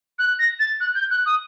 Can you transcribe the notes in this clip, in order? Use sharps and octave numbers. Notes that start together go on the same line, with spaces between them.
F#6
A#6
A6
F#6
G6
F#6
D#6